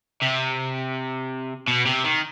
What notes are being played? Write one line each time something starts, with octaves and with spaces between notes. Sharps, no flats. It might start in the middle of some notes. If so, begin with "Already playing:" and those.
C3
B2
C3
D#3